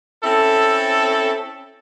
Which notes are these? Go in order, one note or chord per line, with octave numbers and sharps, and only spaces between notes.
C4 C#4 E4 A4